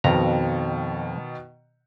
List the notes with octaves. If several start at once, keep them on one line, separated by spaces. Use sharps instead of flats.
F2 B2 D#3 A#5